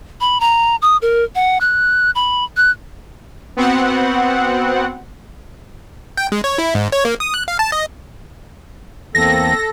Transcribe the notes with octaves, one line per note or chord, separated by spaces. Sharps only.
B5
A#5
D#6
A#4
F#5
F#6
B5
F#6
B3 C4 F#4 F#5
G5
G#3
C#5
E4
G#2
C#5
A#3
D#6
F#6
F5
A5
D#5
E2 A#3 C4 A4 A#6